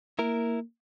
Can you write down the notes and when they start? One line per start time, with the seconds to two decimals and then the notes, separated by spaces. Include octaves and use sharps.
0.19 A#3 E4 A#4